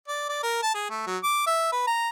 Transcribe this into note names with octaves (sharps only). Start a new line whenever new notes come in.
D5
D5
A#4
A5
G#4
A3
F#3
D6
E5
B4
A#5